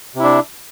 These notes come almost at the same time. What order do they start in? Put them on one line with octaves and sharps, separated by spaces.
C3 E4 D4